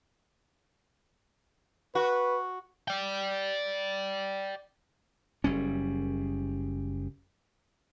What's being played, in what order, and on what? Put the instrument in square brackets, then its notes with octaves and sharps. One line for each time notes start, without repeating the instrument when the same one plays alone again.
[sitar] F#4 [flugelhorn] B4
[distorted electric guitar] D5 G5
[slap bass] F#1 G3 C#4